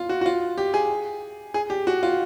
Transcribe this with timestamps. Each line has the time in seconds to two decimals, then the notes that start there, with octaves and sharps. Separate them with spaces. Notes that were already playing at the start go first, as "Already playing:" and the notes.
Already playing: F4
0.09 F#4
0.21 F#4
0.26 F4
0.58 G4
0.74 G#4
1.54 G#4
1.70 G4
1.87 F#4
2.03 F4